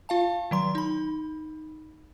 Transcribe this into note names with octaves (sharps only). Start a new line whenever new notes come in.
F4 F5 A5
D#3 F#3 C6
D#4 B5